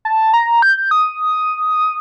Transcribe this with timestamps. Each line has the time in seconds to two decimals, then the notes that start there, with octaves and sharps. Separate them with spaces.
0.05 A5
0.34 A#5
0.62 G6
0.91 D#6